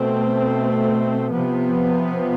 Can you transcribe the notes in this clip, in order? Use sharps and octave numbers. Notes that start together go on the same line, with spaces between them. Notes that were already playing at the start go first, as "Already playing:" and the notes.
Already playing: B2 A3 C4
C3 F3 B3